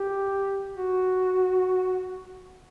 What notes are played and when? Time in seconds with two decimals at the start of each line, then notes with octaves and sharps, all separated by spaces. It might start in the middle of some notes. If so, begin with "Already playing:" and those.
Already playing: G4
0.76 F#4